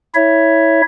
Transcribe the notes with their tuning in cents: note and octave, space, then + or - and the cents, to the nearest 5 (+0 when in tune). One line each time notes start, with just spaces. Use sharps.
E4 -25 C#5 +0 E5 +10